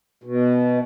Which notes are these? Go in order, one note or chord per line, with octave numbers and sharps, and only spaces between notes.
B2